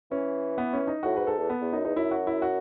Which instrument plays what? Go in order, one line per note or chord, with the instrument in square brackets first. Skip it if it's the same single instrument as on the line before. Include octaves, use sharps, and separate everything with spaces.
[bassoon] E3 [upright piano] C#4
[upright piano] B3
C#4
D#4
[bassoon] A2 [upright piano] F#4
[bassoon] G#2 [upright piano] B4
[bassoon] G#2 [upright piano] A4
[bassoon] E2
[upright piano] B3
[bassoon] E2
[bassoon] F#2 [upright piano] D#4
[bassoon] E2 [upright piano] D#4
[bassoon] F#2 [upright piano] E4
[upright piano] F#4
E4
F#4